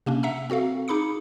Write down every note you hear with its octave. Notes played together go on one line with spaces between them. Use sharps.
C3 A#3 C#4 D4
E5 F#5 A#5 E6
C4 F#4 A4 F5
D#4 G#4 B5 D6 C#7